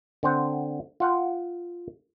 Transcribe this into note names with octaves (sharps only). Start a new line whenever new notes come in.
D3 C4 C5 F#5
F4 F#5 G5